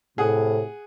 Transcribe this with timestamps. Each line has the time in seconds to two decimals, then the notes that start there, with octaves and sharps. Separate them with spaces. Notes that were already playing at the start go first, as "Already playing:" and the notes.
0.18 A2 C3 G#4 F#5